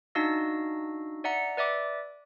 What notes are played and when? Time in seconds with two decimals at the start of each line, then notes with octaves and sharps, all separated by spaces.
0.15 D4 D#4 F#4 F5 E6 A#6
1.24 D5 E5 F#5 A#5 C#7
1.57 B4 D5 E5 D6